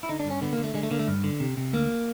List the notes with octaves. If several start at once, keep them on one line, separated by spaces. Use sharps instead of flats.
E4
D3 D#4
D4
G2
C#4
D3 B3
A#3
D3
A3
D3 G#3
A3
D3 A#3
A3
G2
D3
C3
C3
D2 A#3